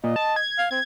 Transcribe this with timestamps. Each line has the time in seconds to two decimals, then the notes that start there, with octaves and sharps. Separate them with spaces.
0.04 A#2 D#5
0.16 A5
0.36 G#6
0.58 F5
0.71 C4 G#6